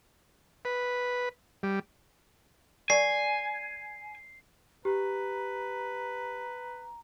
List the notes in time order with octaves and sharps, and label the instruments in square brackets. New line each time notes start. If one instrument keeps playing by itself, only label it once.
[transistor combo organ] B4
G3
[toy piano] A#4 D5 C#6 [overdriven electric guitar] G#5 [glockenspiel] C7
[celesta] G4 [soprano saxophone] B4 [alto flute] A#5